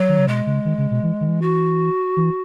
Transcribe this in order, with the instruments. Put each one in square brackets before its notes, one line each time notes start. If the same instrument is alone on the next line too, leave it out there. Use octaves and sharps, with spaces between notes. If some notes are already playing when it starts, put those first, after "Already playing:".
Already playing: [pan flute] F#3
[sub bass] D#3
C#3
[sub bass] B2 [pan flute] G#3
[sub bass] C#3
D#3
C#3
B2
E3
D#3
E3
[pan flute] F#4
[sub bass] E3